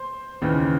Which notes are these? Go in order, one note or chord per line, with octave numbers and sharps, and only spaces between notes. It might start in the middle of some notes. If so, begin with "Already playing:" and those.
Already playing: C5
D#2 C#3 E3